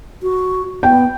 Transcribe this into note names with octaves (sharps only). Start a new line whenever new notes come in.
F#4
B3 G5